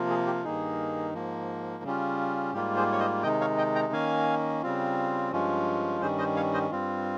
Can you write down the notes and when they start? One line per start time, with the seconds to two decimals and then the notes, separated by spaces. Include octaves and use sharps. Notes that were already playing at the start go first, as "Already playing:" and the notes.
Already playing: C3 F3 A#3 F4
0.10 G#4
0.27 G4
0.44 G2 D#3 A#3 D#4 G#4
1.14 G#2 F3 A#3
1.84 C#3 G3 C#4 F4
2.53 G#2 G3 A#3 F4 G4
2.76 G#4 C5
2.92 C#5
3.00 C5 D#5
3.23 C3 D#3 G#3 D#4 D#5 G5
3.41 C#5 F5
3.58 D#5 G5
3.75 G5 A#5
3.92 D#3 A#3 C#4 F5 G#5
4.63 C#3 G3 C4 F4
5.32 G2 F3 G#3 C#4 F4
6.01 G2 D#3 G3 C#4 G#4 C5
6.18 C5 D#5
6.36 C#5 F5
6.54 C5 D#5
6.71 G2 G3 C4 F4